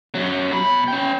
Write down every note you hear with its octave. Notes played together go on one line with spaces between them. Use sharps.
F#2 F#3
B2 B5
C#4 G5